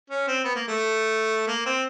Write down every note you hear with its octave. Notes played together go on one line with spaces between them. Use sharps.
C#4
C4
B3
A#3
A3
A#3
C4